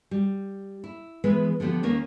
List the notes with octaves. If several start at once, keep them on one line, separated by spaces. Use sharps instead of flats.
G3
E4
E3 G#3 B3 G#4 B4
D3 F3 B3 G4 C5
D#2 A#3 C#4 D#5